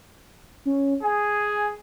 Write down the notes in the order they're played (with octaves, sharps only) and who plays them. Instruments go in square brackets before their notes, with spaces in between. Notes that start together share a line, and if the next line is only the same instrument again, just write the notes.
[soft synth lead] C#4
[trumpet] G#4 [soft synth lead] G#5